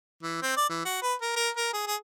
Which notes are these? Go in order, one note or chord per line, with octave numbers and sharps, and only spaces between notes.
E3
C4
D5
E3
F#4
B4
A#4
A#4
A#4
G#4
G#4